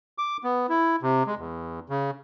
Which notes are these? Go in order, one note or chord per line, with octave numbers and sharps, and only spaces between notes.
D6
B3
E4
C3
G#3
E2
C#3